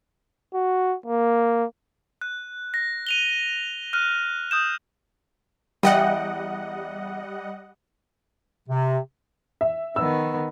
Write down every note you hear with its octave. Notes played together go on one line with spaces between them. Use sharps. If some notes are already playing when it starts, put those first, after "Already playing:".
F#4
A#3
F#6
A#6
D#7 F7 G7
F6 F#6 D#7
D#6 G6 E7
E2 G3 D#5 F#5 G5
C3
E5
D#3 B3 E6